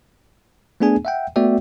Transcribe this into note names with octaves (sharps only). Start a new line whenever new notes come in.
A3 B3 D4 G#4 G#5
E5 F#5 G5
A3 B3 F#4 D5 E5 G5